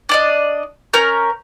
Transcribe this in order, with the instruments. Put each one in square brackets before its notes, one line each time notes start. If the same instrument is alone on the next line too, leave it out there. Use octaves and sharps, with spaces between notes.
[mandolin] D4 D5 D#5
C#4 A#4 G6